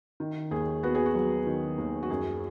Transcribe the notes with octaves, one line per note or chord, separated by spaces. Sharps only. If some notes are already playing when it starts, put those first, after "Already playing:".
D#3
D#2 G#4
B3 F#4
G#4
F#4
F#3
D#3
D#2
F#4
F#2 G#4